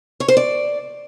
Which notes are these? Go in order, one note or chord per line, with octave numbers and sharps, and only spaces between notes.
C#5
C5
D5